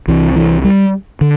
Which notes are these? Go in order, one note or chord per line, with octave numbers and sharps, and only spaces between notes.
C2 C3 E3
E3
G3
D3